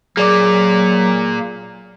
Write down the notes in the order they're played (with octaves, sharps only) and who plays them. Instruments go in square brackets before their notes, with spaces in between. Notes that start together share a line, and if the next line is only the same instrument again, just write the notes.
[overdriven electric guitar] A#2 A#3 [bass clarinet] F#3 [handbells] G#4 D5 D6